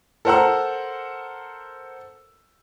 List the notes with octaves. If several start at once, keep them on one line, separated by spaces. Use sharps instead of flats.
A4 A#4 C5 F#5 A#5 E6